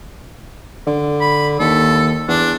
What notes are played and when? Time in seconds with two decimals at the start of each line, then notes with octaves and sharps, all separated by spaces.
0.87 D3
1.21 B5
1.59 D#2 A4
2.28 E2 D4